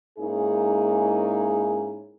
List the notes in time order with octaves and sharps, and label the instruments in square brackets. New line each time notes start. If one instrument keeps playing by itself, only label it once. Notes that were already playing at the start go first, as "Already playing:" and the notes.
[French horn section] G#2 A#3 C#4 D#4 E4 G#4